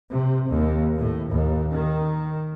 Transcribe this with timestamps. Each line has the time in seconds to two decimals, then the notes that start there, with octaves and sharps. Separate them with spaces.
0.11 C3
0.48 D#2
0.97 A2
1.31 D#2
1.74 D#3